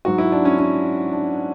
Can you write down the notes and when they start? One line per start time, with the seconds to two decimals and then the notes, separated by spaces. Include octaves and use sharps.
0.05 G#2 F#3 F#4
0.18 E4
0.32 D4
0.45 C#4
0.59 C#4
1.13 D4